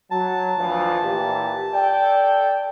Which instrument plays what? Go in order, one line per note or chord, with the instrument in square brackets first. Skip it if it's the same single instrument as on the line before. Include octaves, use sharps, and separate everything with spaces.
[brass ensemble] F#3 [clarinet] A5
[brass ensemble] D2 E3 F3
A#2 E3 G4
A4 D5 G5